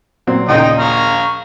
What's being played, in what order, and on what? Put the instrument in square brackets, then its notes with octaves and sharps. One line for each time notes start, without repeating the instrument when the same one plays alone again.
[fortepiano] A#2 F#3 C4
[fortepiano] D#2 A#2 C#3 [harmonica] D#4 D#5 G5
[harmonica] F5 A#5 C#6